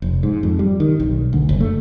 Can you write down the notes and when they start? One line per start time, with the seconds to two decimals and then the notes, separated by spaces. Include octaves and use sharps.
0.02 F1
0.23 G#2
0.43 F2
0.59 G3
0.80 D#3
1.00 B1
1.33 D2
1.49 F#1
1.60 A3